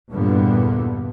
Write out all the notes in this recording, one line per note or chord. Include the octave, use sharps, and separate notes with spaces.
E2 G2 A#2 D3 B3